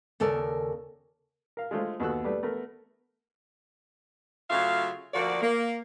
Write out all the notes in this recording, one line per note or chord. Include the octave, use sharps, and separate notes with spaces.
D#2 C#3 A4 A#4 D5
A#4 F5
G#3 A3 F4 C5
D#2 B3 F#4 A4 E6 F#6
G3 A3 B4
A3 B3 A#4
C#3 F#3 A3 F4 E5 F5
D2 F3 A#3 F#4 D5
A#3